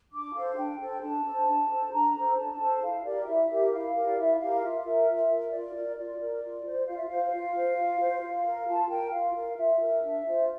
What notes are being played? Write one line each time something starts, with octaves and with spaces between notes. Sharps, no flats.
D4 D6
A4 C5 F5
D4 G5
A4 C5 G5
D4 A5
A4 C5
D4
A4 C5
D4 A#5
A4 C5
D4 A5
A4 C5
E4 F5
G4 A#4 D5
E4 E5
G4 A#4
E4 F5
G4 A#4
D5
E4 E5
G4 A#4 F5
F4 E5
A#4
F4
A#4
F4 D5
A#4
F4 D5
A#4
F4
C5
F4 F5
E5
C5 F5
F4
C5
F4
C5
F4
A#4
F4 A5
A#4 G5
F4 F5
A#4
F4 E5
A#4
D4
F4 C5